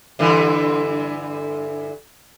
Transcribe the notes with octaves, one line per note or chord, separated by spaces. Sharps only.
G2 D3 E3